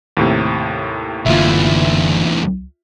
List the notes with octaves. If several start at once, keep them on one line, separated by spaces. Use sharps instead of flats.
D#2 A2 C3
F#1 D2 D3 E3 A#3 F4 E5